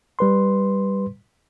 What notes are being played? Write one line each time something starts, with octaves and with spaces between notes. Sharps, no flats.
G3 B4 C6